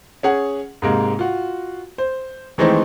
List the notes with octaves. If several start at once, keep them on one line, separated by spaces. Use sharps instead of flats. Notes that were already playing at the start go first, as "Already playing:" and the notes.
C#4 G#4 F#5
G#2 C3 G#3 A#3
F4 F#4
C5
D#3 E3 G#3 A3 C4 D#4